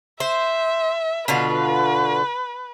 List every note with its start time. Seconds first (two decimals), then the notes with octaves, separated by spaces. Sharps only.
0.20 C5 E5
1.28 B2 D3 F4 B4